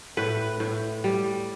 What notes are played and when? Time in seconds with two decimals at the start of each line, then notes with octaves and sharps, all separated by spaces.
0.17 A2 B4
0.60 A2
1.04 G3